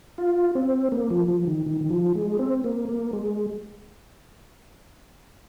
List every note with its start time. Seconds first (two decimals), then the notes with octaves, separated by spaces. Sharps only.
0.18 F4
0.55 C4
0.92 A#3
1.11 F3
1.28 F3
1.47 D#3
1.66 D#3
1.81 D#3
1.90 F3
2.15 G#3
2.39 C4
2.64 A#3
2.89 A#3
3.13 G#3